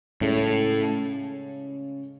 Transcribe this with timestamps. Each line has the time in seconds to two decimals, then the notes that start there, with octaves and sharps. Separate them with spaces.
0.21 A2 C#3 G#3 C#4 G#4 C#5